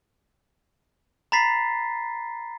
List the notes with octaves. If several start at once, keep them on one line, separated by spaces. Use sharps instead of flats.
A#5 B5 A6 B6 C7